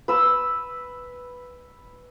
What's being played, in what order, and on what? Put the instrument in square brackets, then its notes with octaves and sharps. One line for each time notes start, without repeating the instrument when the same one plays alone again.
[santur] B4 E6